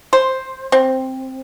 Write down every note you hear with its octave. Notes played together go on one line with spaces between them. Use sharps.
C5
C4